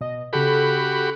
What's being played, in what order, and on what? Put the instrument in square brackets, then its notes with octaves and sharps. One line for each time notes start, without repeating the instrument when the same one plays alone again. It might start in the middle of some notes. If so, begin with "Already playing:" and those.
[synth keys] B2 D#5
[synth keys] C#3 A4 [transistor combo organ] F#4 G4 B5